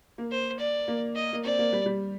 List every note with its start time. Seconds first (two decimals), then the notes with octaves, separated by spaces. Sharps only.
0.18 A#3
0.31 C5
0.59 D5
0.88 A#3
1.16 D#5
1.33 A#3
1.44 C4 D5
1.59 A#3
1.73 G3
1.86 G3